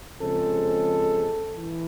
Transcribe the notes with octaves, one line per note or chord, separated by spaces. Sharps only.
C#3 F3 G#3 C4 A4
E3